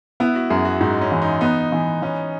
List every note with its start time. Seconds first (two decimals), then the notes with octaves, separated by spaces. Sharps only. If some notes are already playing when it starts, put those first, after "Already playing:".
0.20 B3 E4
0.35 F#4
0.50 F#2 G#4
0.65 F#4
0.81 G#2 D#4
1.01 C#4
1.12 E3
1.21 D#4
1.41 B3 D#4
1.72 E3
2.02 E3 C#4